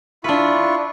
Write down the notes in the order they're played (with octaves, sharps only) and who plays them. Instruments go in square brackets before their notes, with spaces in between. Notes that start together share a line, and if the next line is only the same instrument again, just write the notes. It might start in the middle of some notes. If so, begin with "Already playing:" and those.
[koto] D4 B4 [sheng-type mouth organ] E4 F4 C#6